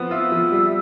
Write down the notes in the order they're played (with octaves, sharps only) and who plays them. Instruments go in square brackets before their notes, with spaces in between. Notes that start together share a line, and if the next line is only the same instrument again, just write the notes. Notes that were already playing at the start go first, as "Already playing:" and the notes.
Already playing: [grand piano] F3 B3 C4
[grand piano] F4 [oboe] E5
[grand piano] F3
G3